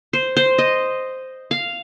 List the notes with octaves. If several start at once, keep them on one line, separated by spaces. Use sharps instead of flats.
C5
C5
D#5
F5